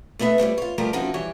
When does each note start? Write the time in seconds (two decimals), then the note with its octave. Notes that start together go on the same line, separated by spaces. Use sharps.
0.19 A3 B3 D#4 B4 E5
0.38 F2 G3 A3 E4
0.58 F4 C#5
0.78 F3 G3 A3 F4 G4 A#4
0.93 F3 C4 C#4 D#4 E4 F#4
1.14 E3 G3 C#5